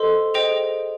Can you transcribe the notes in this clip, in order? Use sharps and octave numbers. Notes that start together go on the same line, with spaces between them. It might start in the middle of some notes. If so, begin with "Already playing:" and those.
Already playing: A4 C5 D#5 C6
G#4 C5 D#5 G5